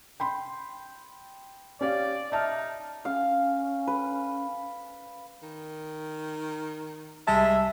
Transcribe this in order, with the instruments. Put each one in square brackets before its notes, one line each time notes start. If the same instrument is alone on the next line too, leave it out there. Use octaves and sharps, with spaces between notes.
[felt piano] G5 B5 C6
[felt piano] C#4 G4 F5 [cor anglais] D5
[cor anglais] D#4 [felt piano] E5 A5 F6
[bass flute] C#4 [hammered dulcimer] F5
[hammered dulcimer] B4
[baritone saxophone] D#3
[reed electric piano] C2 G3 A5 [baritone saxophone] G#3 [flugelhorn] E5